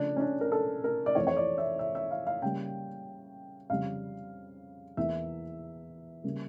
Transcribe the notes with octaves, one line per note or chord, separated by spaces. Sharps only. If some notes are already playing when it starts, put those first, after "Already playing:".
Already playing: C#3 F3 A3 D4
C#4
D4
A#4
A4
A#4
D5
F2 E3 A3 C#5
C#5
D5
E5
E5
E5
F5
F5
C#3 G3 A#3 G5
F2 C#3 G3 F5
E2 E3 A#3 E5
C#3 G3 A#3